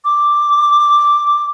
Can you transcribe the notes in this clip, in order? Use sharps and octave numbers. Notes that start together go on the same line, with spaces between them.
D6